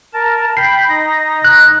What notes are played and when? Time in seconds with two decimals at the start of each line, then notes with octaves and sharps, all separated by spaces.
0.13 A#4 A5
0.57 G5 B5 C7
0.89 D#4 A#6
1.44 F#6